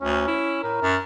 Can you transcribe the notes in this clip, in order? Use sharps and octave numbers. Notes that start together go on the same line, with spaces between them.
D2 C#4
E4
A2 A#4
F#2